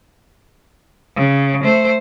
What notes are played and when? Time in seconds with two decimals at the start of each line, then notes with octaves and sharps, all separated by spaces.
1.16 C#3
1.64 A3 C5